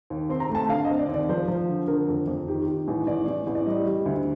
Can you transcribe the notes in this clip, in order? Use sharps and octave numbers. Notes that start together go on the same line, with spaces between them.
D#2
C4 C6
A#5
A3
A5
D3 F5
D#5
C4
D5
D#2
D5
F3 C5
F3
D3
D3 A#4
F2
F2
D#3 G4
D#3
A1
A1 D5
A1
A1
D5
G3 D#5
G3
D2